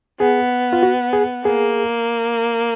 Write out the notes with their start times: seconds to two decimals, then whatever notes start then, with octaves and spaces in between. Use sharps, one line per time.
0.20 B3 G#4
0.73 F4
0.83 F#4
1.13 G#4
1.44 A#3 G#4